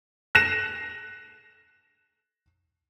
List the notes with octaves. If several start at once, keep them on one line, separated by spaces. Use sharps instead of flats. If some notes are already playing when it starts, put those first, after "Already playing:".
F#6 A#6 C7 E7